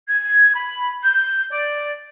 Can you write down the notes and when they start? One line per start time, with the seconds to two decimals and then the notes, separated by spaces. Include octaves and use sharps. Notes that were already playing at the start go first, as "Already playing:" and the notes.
0.07 G#6
0.54 B5
1.02 G6
1.50 D5